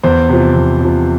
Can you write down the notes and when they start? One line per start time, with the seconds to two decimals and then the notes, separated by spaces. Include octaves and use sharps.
0.03 E2 C5
0.29 C3 F3
0.56 E2
0.81 C3 F3